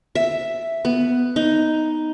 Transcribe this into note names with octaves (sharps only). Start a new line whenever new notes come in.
E5
B3
D#4